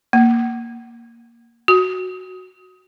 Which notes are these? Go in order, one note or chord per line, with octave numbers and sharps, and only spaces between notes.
A#3
F#4